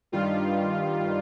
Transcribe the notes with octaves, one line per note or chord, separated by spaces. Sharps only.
G2 D#3 G3 F4